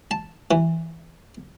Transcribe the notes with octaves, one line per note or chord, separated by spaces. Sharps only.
A5
E3